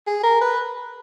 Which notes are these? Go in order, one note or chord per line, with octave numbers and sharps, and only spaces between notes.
G#4
A#4
B4